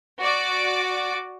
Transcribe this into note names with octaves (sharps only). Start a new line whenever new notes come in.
F#4 D5 D6